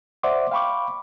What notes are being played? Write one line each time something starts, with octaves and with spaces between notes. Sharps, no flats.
C5 D5 E5 F#5 C6 D6
F5 G5 B5 C#6 D6